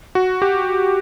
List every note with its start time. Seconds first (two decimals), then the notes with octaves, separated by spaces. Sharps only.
0.15 F#4
0.42 G4